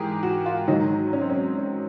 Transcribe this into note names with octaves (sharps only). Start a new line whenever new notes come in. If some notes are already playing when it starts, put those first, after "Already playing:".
Already playing: G#2 E3 G4 G#4 A#4
F#4
F4
G#2 D#3 F#3 D#4
C#4
C4
C#4
C#4